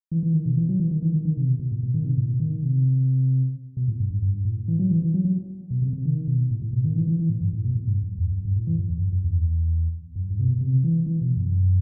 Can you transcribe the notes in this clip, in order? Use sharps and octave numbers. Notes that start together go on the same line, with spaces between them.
E3
E3
D#3
B2
E3
F#3
E3
D#3
E3
D#3
D#3
C3
B2
B2
A2
B2
D#3
C3
A2
B2
D#3
C3
B2
A2
G2
G2
G2
A2
E3
F#3
E3
E3
F#3
F#3
B2
C3
C3
D#3
B2
A2
A2
B2
D#3
E3
E3
E3
A2
G2
A2
B2
A2
G2
F#2
E2
F#2
G2
A2
E3
F#2
E2
F#2
F#2
E2
F#2
G2
C3
B2
C3
E3
E3
B2
F#2